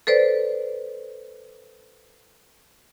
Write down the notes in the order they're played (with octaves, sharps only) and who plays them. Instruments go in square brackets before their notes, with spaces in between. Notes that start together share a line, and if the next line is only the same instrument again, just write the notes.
[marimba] A4 B4 C5 D5